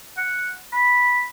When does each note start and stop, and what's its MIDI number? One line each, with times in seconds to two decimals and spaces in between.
0.17 0.53 78
0.73 1.25 83